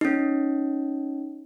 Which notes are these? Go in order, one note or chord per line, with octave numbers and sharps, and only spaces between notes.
C#4 D#4